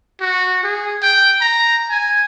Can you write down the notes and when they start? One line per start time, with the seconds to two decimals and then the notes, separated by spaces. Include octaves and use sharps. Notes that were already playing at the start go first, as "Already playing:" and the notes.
0.20 F#4
0.63 G#4
1.02 G5
1.41 A#5
1.90 G#5